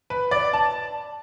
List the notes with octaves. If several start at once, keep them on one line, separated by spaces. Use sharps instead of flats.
B4
D5
A5